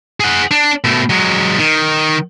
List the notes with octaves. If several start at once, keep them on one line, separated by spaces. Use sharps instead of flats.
G#4 F#5
D4
B2 A3
F#3 G#3
D#3